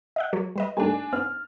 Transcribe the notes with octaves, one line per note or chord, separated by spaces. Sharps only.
D#5 E5 F#5
F#3 A#4 C#5
G3 B4 D#5
G3 A3 A#3 D4 G#5
B3 C4 F6